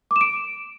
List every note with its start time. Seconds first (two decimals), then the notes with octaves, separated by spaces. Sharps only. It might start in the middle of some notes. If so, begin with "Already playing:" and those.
0.11 D6
0.16 E7
0.21 D7